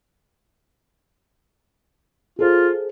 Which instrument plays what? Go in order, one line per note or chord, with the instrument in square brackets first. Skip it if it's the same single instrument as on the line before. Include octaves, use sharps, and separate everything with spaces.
[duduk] F4 [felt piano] G#4 A4 C5